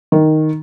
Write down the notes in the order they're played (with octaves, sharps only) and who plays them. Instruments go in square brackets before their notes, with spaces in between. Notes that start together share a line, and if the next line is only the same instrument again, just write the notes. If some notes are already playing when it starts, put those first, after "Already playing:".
[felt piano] D#3